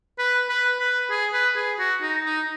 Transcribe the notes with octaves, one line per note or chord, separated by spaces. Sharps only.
B4
B4
B4
G#4
B4
G#4
F#4
D#4
D#4